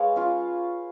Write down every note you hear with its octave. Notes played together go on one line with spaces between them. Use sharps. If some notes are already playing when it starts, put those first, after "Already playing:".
Already playing: G#3 B4 C#5 F5
C#4 F4